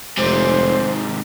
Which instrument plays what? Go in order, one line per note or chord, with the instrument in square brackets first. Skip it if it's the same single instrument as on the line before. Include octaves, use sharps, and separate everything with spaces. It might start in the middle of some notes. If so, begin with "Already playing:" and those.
[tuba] F1 [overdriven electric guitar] G#2 C3 [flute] C5